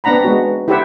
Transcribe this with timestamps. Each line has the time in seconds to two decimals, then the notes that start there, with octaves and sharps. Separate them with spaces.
0.04 B3 C4 D4 F#5 A#5 B5
0.25 G#3 B3 F#4
0.68 E4 G4 A4 C5 E5 F#5